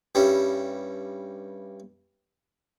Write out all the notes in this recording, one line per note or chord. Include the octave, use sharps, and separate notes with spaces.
G2 G3 C#4 E4